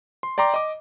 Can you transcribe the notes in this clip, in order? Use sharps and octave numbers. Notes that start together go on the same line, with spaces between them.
C6
D5 G5 A#5 C6 D6
D#5 D6